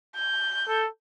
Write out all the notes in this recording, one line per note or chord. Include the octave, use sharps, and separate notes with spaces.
G6
A4